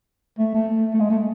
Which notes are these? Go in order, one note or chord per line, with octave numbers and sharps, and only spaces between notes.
A3
A3
A3
G#3
A3